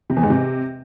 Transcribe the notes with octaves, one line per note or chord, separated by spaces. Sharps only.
C3
E2
G#2
C3